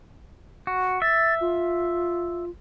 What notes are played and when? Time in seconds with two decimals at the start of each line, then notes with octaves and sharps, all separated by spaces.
0.67 F#4
1.02 E5 A6
1.41 F4